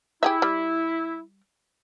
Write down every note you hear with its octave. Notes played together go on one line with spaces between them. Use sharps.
E4 G4 G#4 E5
G3